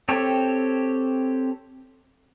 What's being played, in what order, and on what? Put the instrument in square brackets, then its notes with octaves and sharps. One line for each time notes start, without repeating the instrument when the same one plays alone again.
[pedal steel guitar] C4 G4 A4 C#5